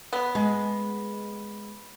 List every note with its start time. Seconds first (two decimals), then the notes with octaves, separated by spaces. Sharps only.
0.13 B3
0.35 G#3